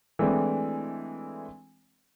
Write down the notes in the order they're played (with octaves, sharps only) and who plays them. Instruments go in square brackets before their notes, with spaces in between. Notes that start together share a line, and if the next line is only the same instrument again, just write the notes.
[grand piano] E3 G#3 A3 C4 D4 E4